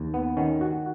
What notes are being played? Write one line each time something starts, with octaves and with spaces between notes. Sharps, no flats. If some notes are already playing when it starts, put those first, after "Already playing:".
Already playing: D#2
B3
D#3 C#4
F#4